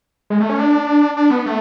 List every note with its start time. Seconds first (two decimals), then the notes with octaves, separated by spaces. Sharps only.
0.30 G#3
0.40 A3
0.49 C#4
0.59 D4
1.17 D4
1.31 B3
1.46 A3